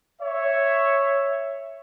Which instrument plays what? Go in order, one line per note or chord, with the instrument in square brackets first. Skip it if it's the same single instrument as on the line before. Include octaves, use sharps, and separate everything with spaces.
[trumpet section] C#5 E5